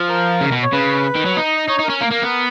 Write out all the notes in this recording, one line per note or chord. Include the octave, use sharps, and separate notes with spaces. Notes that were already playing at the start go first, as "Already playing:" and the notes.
Already playing: F3
A#4
C#3
B2
C#5
C#3 B4
D#3
F#3
D#4
D#5
D#4 C#5
D#4
C#4 A#4
A#3 A#4
A#3
B3